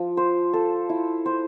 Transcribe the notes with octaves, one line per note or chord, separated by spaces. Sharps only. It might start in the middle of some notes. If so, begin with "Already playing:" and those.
Already playing: F3
C5
A4
E4
C5